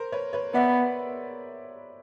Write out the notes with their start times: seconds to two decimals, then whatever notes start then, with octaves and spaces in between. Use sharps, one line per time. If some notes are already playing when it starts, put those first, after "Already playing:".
Already playing: A#4 C5
0.12 B4 C#5
0.33 B4 C#5
0.54 B3 D5 E5